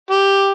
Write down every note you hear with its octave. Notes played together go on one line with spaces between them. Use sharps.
G4